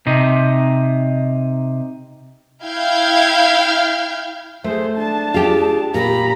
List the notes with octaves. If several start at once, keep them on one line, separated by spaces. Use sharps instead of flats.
C3 D#4
E4 F5 G5 F6 G6 G#6
A3 G#4 C5
D4 A5
F4 G4 G#4
A#2 G4 A#5 B5